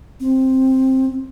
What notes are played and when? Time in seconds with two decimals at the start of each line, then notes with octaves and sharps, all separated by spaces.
0.20 C4